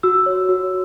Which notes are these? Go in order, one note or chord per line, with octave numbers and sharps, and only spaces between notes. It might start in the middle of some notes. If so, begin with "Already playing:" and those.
F#4 E6
C#5
F#4